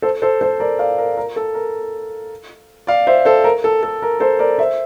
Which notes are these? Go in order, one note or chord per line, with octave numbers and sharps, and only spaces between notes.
A4 C5
A4 C5
A4 C5
A#4 D5
D5 F5
A#4
A#4
A4
A#4
D5 F5
C5 E5
A4 C5
A#4
A4
A4
A#4
A4 C5
A#4 D5
C5 E5